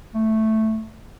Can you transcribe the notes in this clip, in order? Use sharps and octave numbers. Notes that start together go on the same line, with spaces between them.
A3